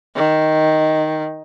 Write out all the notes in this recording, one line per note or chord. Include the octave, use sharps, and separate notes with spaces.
D#3